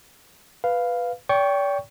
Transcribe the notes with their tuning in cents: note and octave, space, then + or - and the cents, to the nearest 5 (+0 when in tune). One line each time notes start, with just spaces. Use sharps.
B4 +0 F5 +0
D5 -45 G5 +0 C#6 +0